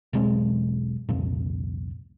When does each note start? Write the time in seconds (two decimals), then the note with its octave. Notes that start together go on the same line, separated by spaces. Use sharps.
0.13 E1 B1 G#3 C4
1.09 C2 F2 A#2